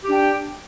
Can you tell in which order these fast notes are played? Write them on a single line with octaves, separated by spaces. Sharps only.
G4 D4 G5